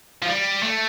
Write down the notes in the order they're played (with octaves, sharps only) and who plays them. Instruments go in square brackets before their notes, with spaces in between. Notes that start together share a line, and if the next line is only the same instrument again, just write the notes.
[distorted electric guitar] F3
G3
A3